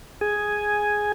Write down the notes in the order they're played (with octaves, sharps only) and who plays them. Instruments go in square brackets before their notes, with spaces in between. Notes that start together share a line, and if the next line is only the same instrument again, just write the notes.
[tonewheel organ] G#4 G#5